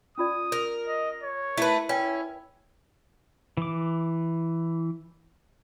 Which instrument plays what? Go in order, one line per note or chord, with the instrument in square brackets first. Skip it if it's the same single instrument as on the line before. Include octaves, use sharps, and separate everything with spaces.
[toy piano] C#4 F4 D5 [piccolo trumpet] D#6
[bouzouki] A#4
[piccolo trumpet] D#5
C#5
[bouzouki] A3 B4 [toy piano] E4 A#4
[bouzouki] C#4 [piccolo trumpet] E4 [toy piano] B4 G5 G#5
[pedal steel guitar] E3 D6